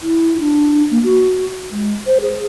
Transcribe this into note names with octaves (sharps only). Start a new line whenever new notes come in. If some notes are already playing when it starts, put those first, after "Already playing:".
E4
D4
A#3
F#4
G#3
C5
G#4